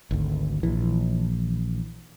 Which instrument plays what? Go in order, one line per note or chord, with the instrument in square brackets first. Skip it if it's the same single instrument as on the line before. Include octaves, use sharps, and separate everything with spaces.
[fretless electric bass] G#1 D2
[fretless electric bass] A#1 [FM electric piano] E3